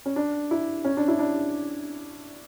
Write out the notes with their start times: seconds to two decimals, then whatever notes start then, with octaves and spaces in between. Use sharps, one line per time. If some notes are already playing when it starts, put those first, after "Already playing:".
0.06 C#4
0.16 D4
0.51 E4
0.85 C#4
0.97 D4
1.08 E4
1.19 D4